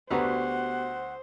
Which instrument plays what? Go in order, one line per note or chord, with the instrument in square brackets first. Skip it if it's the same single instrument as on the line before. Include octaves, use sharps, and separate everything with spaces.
[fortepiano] D2 B4 A#5 [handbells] B3 F#4 G4 [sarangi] C5 [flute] F#5